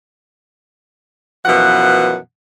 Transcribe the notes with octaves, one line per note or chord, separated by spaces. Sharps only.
F#2 B2 E3 F3 F#5